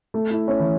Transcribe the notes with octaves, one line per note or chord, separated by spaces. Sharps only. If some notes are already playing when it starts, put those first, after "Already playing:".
A3
E4
C#4
E3